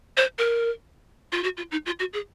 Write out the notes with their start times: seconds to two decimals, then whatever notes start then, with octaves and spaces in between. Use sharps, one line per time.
0.17 C5
0.38 A#4
1.32 F4
1.44 F#4
1.57 F4
1.71 D#4
1.86 F4
2.00 F#4
2.13 G#4